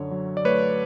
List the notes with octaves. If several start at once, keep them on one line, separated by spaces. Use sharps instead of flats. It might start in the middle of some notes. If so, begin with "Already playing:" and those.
Already playing: F#2 D3 C#5
F#3
D5
A3 B4 C#5